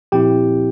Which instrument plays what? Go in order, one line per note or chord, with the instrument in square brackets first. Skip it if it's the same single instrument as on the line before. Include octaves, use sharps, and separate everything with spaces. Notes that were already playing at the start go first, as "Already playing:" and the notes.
[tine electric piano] A#2 F3 C4 E4 G4 G5